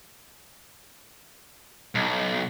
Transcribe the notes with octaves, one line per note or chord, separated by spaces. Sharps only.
B1